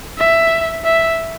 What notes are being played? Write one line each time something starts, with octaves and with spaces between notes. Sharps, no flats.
E5
E5